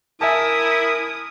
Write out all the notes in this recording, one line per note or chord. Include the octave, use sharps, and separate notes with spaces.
E4 A#4 E5 G#5 A5 D#6